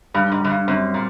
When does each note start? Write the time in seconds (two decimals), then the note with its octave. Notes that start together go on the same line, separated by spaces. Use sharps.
0.14 G2 G3
0.32 G#2
0.41 F#2 G3
0.50 G2
0.68 F#2 C4
0.94 A#2